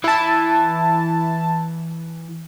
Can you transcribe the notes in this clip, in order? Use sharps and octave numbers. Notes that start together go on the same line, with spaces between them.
E3 E4 A5